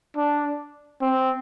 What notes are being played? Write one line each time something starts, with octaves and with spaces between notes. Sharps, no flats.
D4
C4